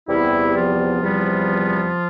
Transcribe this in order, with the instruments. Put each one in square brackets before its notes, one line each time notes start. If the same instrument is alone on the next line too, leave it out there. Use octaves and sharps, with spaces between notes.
[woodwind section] E2 C3 G3 B3 E4
F3 F4
E2 C3 G3 B3